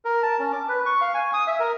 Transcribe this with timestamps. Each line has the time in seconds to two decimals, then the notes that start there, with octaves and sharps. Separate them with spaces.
0.05 A#4
0.23 A5
0.39 C#4
0.53 D6
0.69 B4
0.86 C#6
1.01 F5
1.14 G#5
1.33 D#6
1.47 E5
1.60 A#4